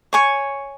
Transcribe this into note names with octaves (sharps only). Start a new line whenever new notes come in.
C#5 G#5 C#6